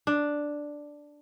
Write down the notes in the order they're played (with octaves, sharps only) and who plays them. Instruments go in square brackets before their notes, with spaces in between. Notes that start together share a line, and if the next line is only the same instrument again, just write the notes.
[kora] D4